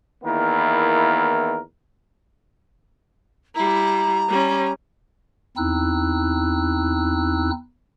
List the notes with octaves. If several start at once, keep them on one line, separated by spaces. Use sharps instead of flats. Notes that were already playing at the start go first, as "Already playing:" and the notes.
E2 D#3 A#3 B3 E4 A#4
G3 E4 A#5
G3 C#4
E2 C4 D#4 E4 E6 F#6